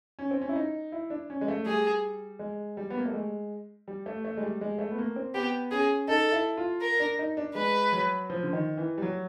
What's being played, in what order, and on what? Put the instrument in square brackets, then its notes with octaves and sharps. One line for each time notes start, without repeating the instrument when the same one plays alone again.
[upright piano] C#4
C4
C#4
E4
D#4
E4
D4
C#4
G#3
A3
[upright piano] G3 [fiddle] G#4
[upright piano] G#3
G3
B3
A#3
A3
G#3
G3
A3
A3
G#3
G3
G#3
A3
B3
A#3
C4
[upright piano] B3 [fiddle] G4
[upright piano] C#4 [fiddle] G#4
[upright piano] D#4 [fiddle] A4
[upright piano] E4
F4
[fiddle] A#4
[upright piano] D4
D#4
D4
[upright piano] G#3 [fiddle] B4
[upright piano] F#3
F3
D3
D#3
E3
G3
F#3